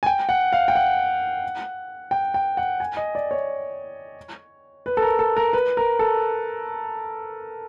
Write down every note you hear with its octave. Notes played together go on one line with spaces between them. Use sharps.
G#5
G5
F#5
F5
G5
F#5
G5
G5
F#5
G#5
D#5
D5
C#5
B4
A4
A#4
A4
A#4
B4
A#4
A4